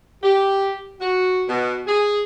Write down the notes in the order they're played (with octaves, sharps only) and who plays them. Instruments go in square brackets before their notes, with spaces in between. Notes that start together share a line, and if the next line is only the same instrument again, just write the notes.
[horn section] G4
F#4
B2
G#4